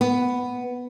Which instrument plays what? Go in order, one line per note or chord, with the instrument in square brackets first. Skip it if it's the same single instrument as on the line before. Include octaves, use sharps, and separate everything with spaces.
[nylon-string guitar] B3